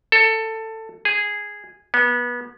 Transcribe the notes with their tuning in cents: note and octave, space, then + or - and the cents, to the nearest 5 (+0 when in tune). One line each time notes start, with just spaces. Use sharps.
A4 +15
G#4 -10
B3 -25